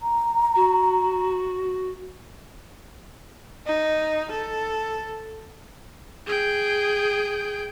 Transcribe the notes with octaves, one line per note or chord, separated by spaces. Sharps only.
A#5
F#4
D#4
A4
G#4 G5